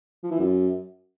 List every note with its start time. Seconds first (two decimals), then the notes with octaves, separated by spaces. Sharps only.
0.23 F3
0.31 E3
0.39 F#2